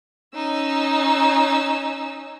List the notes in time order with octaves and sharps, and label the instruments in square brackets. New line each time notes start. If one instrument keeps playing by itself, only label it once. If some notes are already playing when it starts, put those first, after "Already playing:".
[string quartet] C#4 D#4 E6